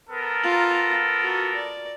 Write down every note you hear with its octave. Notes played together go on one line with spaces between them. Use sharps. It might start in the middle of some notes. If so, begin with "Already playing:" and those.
B3 A4 A#4
F4 A#5
F#4
D5